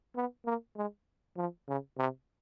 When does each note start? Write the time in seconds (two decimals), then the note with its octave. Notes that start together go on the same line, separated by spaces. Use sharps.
0.16 B3
0.46 A#3
0.76 G#3
1.37 F3
1.68 C#3
1.98 C3